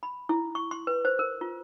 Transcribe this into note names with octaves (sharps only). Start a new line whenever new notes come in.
B5
E4
C#6
C6
B4
C5
A#4
F4